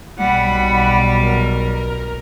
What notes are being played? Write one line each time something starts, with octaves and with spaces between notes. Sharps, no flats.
B1 B2 G3 F#5 B5
A#4